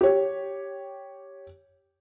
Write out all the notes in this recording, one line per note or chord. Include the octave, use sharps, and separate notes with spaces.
G4 C#5